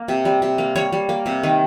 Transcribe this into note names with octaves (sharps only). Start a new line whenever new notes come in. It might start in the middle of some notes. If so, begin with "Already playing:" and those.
Already playing: A#3
C3
G3
C3
A#3
G3 C#5
G3
A#3
C3
D#3